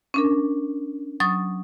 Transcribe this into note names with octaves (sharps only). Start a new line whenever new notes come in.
C#4 D4 A#4
F#3 C#6 D#6 A6